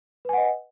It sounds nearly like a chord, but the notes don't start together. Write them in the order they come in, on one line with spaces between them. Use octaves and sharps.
B4 G#5 F#5 D#5